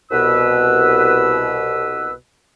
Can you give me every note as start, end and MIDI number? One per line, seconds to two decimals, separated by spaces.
0.11 2.13 36
0.11 2.13 47
0.11 2.13 71
0.11 2.13 88